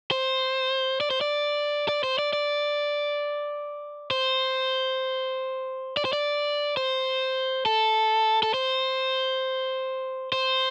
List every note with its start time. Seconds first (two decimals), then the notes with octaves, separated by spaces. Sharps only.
0.11 C5
1.01 D5
1.10 C5
1.21 D5
1.89 D5
2.04 C5
2.19 D5
2.33 D5
4.11 C5
5.97 D5
6.05 C5
6.13 D5
6.77 C5
7.66 A4
8.43 A4
8.54 C5
10.32 C5